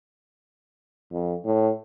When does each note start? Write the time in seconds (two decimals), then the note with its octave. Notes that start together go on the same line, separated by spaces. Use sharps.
1.12 F2
1.45 A2